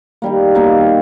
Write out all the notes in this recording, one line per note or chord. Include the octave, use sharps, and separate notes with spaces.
D#3 G3 A#3
B2 A#3 D#4